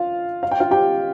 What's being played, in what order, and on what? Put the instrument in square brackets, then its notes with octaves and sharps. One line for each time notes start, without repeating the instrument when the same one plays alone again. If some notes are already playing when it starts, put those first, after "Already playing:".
Already playing: [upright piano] F4 F5
F5
G5
F4 F5
G4 G5